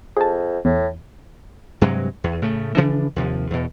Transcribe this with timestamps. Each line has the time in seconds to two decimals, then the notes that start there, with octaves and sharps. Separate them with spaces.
0.17 F2 G#4 A5
0.65 E2 A2
1.81 G2 C3 F#3 G#3
2.24 E2
2.42 A2 C#3 A3
2.77 C#3 E3 F3 D4
3.16 D#2 C3 F3
3.50 E2 B2